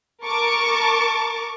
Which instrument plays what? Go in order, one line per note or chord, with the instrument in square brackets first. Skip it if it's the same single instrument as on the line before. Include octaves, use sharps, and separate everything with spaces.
[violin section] A#4 A5 C#6 D6